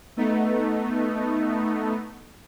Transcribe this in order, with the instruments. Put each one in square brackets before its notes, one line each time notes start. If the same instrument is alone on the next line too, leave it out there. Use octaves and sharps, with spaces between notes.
[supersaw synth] A3 B3 D#4